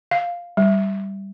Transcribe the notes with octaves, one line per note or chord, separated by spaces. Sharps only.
F5
G3